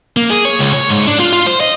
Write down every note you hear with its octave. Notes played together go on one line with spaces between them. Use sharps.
A#3
G#4
C#5
C#2
C#5
G#2
D4
F4
F4
C5
D#5